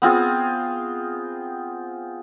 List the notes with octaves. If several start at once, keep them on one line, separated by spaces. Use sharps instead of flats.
B3 C4 F4 G#4